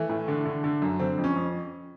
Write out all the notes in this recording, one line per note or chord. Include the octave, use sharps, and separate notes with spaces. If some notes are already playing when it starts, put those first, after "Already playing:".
Already playing: E3 A3
A2
D3
D3
D3
F#2
D3 C4
F2
C#4
F2